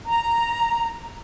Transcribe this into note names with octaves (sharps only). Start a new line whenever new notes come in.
A#5